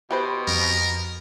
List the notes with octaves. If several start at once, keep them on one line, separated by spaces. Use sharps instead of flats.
B2 G4 B4 C5
F2 A#4